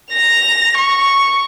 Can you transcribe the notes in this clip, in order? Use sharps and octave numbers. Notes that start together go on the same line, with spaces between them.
A#6 F7
C#6